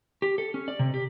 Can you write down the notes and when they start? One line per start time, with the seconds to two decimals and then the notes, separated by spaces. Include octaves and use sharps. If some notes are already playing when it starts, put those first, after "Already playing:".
0.22 G4
0.38 A4
0.54 C#4
0.68 D5
0.79 C3
0.94 G4